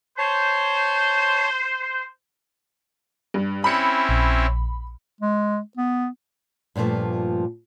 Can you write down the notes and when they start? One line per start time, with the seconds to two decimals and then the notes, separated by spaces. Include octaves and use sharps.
0.18 C5 C#5 A5
3.34 G2
3.64 C4 C#4 E4 B5 C#7
4.09 A#1
5.21 G#3
5.77 B3
6.76 G2 A#2 D3 F3 A3